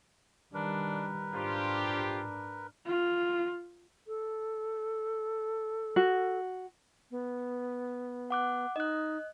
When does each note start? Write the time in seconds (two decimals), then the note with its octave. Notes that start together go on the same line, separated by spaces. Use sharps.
0.54 D#3 G3 D4 A#4 B4
1.34 G#2 D4 F4 G4 C5
2.87 F4
4.08 A4
5.96 F#4
7.11 B3
8.30 F#5 D6 F#6
8.76 D#4 D#5 F#6